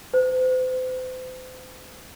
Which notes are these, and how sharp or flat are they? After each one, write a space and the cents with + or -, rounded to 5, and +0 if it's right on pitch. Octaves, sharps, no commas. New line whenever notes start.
C5 -40